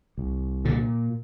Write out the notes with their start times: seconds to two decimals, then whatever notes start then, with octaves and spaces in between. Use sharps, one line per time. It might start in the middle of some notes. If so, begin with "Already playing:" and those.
0.18 C2
0.65 A#2 D3